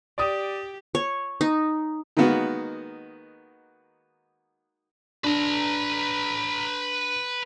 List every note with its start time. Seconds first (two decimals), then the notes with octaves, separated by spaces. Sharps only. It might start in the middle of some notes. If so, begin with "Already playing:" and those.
0.18 G4 D5 D#6
0.95 C#5
1.41 D#4
2.17 D#3 G#3 A#3 B3 F#4
5.24 D4 B4 A#5